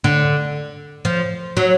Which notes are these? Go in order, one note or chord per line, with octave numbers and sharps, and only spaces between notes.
D3
F3
F#3